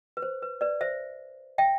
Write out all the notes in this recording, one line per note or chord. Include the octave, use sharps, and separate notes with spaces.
B4
C5
B4
B4 D5
C5 E5
E5 G5